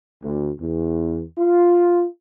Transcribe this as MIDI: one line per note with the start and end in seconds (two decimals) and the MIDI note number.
0.22 0.50 38
0.59 1.22 40
1.38 2.05 65